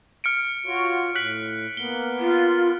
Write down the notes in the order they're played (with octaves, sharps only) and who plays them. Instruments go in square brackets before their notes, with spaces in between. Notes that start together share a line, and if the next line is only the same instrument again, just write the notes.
[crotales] F6 C#7 D7
[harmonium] F4 F#4 C#5
[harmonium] A2 [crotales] F#6 B6 F#7
[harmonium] A#3 B3 [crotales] G7
[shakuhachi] F4